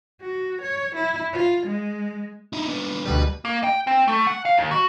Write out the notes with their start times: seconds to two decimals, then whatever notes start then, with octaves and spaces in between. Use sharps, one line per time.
0.21 F#4
0.62 C#5
0.95 E4
1.33 F4
1.67 G#3
2.53 D#4 E4
2.67 B3 D4
3.05 D2 B2 G3 B4
3.45 A#3
3.64 G5
3.87 C4
4.08 A3
4.27 F#5
4.45 F5
4.58 D#2
4.71 F#4